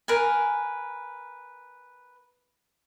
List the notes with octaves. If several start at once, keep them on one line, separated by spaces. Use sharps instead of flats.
A#4 B4 G#5